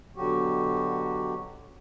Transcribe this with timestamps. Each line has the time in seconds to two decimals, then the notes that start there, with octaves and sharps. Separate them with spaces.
0.16 B2 D3 F#3 F#4 G4